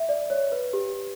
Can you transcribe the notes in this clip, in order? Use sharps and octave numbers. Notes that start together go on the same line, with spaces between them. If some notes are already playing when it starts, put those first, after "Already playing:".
Already playing: E5
D5
C#5
B4
G4